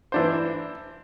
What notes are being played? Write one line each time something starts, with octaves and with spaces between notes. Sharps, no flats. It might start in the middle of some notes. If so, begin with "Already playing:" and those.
E3 D4 C5